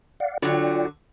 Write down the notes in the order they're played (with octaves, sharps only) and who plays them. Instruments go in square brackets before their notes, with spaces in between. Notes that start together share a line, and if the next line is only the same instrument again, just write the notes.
[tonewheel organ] D5 F5 F#5
[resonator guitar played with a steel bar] D3 F#3 [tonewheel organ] F4 D5 G5